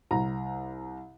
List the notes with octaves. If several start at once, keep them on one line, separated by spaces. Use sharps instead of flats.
C2 A#5